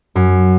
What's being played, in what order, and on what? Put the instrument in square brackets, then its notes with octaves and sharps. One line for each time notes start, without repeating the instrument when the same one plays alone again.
[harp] F#2